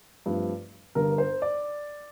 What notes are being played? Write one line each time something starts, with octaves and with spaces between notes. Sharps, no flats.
G2 F3 A3 C4
G1 G2 D3 A#4
C5
D5